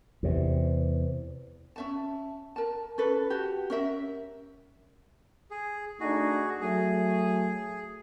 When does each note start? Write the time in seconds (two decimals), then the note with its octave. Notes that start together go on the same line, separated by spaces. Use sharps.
0.23 E2 C3
1.76 C#4 E5 A5
2.56 A#4 A5
2.98 C#4 A4 B4
3.30 F#4 G4
3.70 C#4 A#4 E5
5.51 G#4
6.00 A3 D4 D#4 F#4 G#4
6.61 F#3 A3 G#4